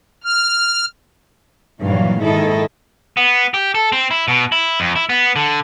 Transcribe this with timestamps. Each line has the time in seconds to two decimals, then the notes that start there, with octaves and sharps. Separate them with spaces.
0.24 F6
1.82 G2 A#2 D#3 E3 F#3 F5
2.22 G#2 D#3 E4 A4 D#5
3.17 B3
3.54 G4
3.75 A4
3.92 C4
4.11 E4
4.28 B2
4.52 E4
4.80 F2
4.96 E4
5.09 B3
5.36 D3